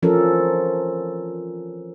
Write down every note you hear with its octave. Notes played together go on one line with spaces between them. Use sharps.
E3 F3 C#4 A4 A#4